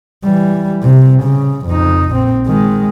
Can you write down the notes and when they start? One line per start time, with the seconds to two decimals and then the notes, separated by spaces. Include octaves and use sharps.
0.24 E3 G3
0.83 C3
1.23 C#3
1.67 F2 D#4
2.10 A#1 C4
2.47 D#3 G#3